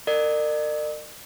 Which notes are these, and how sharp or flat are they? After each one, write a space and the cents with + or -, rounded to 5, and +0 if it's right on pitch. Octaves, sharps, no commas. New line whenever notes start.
A#4 -30 D5 +45